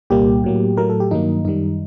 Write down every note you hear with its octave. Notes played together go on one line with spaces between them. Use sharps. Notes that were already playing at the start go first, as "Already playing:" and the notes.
C2 A#2 G3 A#3 G4
A2 F#3 A#3
A2 F#3 A3 A#4
A4
G4
G2 D#3 F#3 A#3 D#4
F#2 D#3 G3 D#4